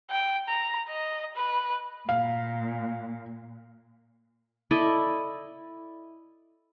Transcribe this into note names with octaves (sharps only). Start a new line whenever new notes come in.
G5
A#5
D#5
B4
A#2 F5
E4 A4 D5 D#5